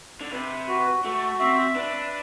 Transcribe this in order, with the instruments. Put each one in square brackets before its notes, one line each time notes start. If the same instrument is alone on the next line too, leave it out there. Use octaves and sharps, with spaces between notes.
[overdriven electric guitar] D3
[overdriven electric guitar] C3 [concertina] B4
[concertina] F#4
[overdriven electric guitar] A3 [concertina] F#4
[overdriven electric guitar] C4 [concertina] E5
[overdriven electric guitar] D4 [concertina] B4